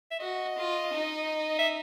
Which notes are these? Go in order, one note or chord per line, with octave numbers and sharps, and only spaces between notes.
E5
F#4 D#5
F4
D#4
E5